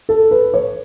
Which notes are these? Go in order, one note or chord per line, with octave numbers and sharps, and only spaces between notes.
A4
B4
C#5